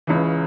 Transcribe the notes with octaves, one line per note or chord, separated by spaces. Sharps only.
C#2 C#3 E3